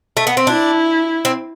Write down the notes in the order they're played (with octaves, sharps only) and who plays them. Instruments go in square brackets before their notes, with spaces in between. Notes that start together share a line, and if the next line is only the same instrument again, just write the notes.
[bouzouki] A3
B3
C4
[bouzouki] D4 [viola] E4
[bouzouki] C4